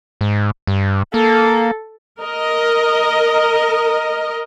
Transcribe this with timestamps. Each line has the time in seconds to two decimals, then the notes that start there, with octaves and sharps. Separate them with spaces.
0.21 G#2
0.67 G2
1.14 A#3 A4
2.20 A#4 D#5